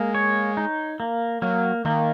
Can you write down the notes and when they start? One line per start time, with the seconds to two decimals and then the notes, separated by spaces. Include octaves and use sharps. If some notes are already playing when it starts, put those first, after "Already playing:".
Already playing: G#3 A#3
0.15 C#5
0.57 D#4
1.00 A#3
1.42 F#3 A#3
1.85 D#3 A#3